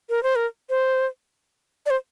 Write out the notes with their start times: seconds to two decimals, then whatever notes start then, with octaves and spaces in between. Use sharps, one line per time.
0.10 A#4
0.23 C5
0.36 A#4
0.70 C5
1.86 D5
1.90 C5